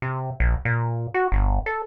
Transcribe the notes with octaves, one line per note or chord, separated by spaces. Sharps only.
C3
A#1
A#2
F#4
G1
A4